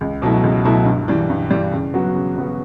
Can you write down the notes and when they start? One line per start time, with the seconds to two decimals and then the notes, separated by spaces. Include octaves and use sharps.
0.01 C#2
0.22 B2 F#3 A3 E4
0.44 C#2
0.65 B2 F#3 A3 E4
0.86 G2
1.08 E3 G3
1.30 G2
1.51 E3 G3
1.72 C#3
1.94 F#3 B3 F#4
2.15 C#3
2.36 F#3 B3 F#4